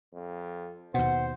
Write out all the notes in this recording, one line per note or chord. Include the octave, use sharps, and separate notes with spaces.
F2
D#2 B2 C5 F#5